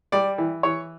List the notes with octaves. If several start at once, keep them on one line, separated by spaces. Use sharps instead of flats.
G3 D5
E3
E3 C#5